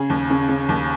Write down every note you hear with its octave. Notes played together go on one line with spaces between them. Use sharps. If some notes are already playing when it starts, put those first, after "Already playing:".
Already playing: C#3 G#4
D#2
C#3
C#3
D#2